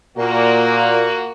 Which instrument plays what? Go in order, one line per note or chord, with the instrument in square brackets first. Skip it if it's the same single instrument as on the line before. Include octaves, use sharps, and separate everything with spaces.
[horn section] A#2 [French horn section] A#3 F#4